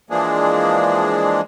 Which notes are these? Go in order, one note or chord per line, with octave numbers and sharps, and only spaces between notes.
E3 F3 G#3 A#3 D4 G#4